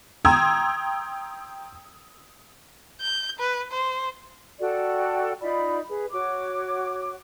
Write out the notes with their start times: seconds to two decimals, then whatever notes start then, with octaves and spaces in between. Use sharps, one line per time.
0.25 G5 A#5 C6 D#6 E6 G#6
3.01 G6
3.39 B4
3.72 C5
4.60 F#4 A4 D5 G5
5.42 D#4 F4 D5 B5
5.88 G#4 B4
6.12 F#4 C#5 D6